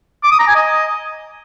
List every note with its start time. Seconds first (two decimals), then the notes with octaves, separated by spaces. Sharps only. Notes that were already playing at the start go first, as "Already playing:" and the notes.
0.23 D6
0.31 D#6
0.39 A#5
0.47 G#5
0.55 D#5